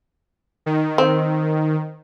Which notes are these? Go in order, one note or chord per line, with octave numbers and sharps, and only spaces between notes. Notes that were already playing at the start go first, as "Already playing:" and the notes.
D#3
C4